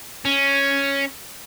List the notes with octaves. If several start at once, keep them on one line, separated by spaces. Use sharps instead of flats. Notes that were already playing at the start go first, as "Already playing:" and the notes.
C#4